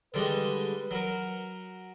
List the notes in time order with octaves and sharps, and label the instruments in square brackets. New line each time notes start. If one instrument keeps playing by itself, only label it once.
[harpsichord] D3 G3 G#3 [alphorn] B4
[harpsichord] F#3 A#4